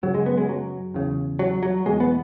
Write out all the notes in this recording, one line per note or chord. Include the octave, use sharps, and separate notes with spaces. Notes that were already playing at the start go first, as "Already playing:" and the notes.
F#2 C#3 F#3
G#3
B3
G#3
F#3
E2 C#3
F#3
F#3
E2 B2 G#3
B3